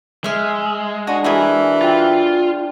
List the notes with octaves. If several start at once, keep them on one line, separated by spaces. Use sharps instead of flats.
G#3 E5 F6
D4 F#4 D#5 G#5 C#6
E3 F#4 G#4 A#4 B4
F4 C5 G5